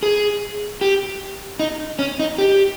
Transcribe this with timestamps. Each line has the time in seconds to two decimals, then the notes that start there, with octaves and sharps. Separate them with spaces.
0.03 G#4
0.81 G4
1.60 D#4
1.99 C#4
2.19 D#4
2.38 G4